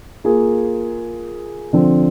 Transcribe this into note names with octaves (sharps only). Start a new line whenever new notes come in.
A#3 F4 G#4
D3 F3 C4